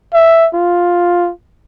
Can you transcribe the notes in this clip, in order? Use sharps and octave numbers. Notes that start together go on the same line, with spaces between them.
E5
F4